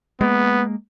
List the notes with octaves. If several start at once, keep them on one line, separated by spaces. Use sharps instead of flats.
G#3 A#3 B3